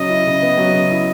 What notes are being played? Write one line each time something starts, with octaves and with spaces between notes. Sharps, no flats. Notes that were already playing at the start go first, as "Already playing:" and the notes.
Already playing: C#3 F#3 D#5
E4
C#3
B3
F#3
C#3
E4